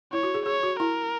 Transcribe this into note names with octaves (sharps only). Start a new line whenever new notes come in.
E4 C#5
F#4
G#4
G#4 C#5
F#4
E4 A#4